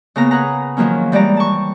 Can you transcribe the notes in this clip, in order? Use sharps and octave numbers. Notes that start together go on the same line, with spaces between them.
C#3 A#3 B3 A#5
G#4 B4 F#5 A#5
D#3 F3 F#3 A#3 C#4
E3 G3 G#3 D5 A#5
A5 C#6